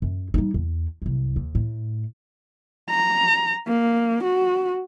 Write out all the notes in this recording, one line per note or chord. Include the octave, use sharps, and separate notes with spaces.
F#2
G3 D#4
E2
C2 F#2
D#2
A2
A#5
A#3
F#4